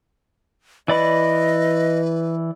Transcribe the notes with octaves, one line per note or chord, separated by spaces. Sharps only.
E3 B4 D5 D#5 B5